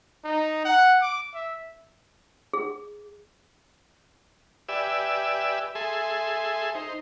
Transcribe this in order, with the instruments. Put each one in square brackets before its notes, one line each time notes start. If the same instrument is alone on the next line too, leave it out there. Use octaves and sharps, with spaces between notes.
[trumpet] D#4
F#5
D6
E5
[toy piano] G#4
[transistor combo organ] G4 B4 D5 E5 G#5 E6
G#4 A4 E5 G#5 C6
D#4 C5